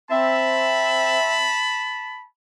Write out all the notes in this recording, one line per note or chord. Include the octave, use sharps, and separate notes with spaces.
C4 E5 A5 B5